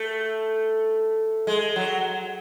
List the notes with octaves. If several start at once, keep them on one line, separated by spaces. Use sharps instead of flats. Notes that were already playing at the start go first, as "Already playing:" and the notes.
Already playing: A3
G#3
F#3